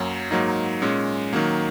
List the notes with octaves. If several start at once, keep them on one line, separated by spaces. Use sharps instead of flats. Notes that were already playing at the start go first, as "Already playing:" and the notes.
Already playing: F#2 F#3 A#3
G#2 F#3 A#3 D#4
A#2 G#3 C#4
D#3 F#3 A#3